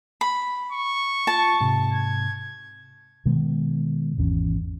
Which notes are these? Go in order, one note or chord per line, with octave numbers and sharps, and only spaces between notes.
B5
C#6
F4 A5
G#2 C3
G#6
B2 D#3 G#3 B3
G#1 E2 C#4